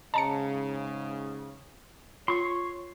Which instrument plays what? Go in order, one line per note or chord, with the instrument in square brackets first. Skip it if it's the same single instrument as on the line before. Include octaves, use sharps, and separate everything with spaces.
[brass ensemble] G#2 C#3 [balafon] D#5 [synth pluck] A5 A#5 C#7
[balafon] F4 [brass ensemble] C#5 [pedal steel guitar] C6 C#6